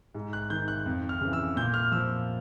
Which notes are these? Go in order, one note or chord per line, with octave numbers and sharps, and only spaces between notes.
G#2
F#6
D#3 G6
F#6
F2
F6
C#3 E3
E6
A#2 G6
F6
F3 E6